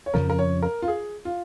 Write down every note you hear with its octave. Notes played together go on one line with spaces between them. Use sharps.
C#5
F2 C#3 F3 C#4 A#4
A#4
C#5
A#4
F4
G#4
F4